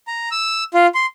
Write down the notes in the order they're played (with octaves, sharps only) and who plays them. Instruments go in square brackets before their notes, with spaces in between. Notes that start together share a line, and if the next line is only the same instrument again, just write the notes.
[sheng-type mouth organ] A#5
E6
F4
C6